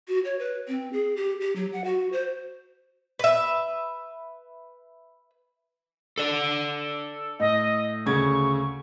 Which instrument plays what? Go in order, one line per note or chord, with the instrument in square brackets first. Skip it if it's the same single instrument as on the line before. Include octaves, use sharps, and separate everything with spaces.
[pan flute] F#4
C#5
B4
C4
G#4
G4
G4
F#3
F#5
F#4
C5
[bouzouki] B4 E5
[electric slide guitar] A4 D5
[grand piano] A2 [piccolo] D#5
[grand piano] D2 C#3 G#6 [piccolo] C#6